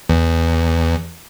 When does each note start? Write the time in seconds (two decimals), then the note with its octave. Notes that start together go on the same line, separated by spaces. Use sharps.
0.09 E2